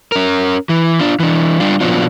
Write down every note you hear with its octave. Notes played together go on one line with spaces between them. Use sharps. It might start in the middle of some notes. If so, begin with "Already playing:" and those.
C#4 A#4
E3
D4 F4
E3 D4
G3 D4 F4
A#2 F3 F#3 B3 D4 F4